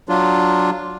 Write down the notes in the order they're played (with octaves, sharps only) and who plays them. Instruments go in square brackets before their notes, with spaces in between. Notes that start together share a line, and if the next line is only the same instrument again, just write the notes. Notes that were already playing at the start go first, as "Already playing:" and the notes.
[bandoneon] F#3 D4 F4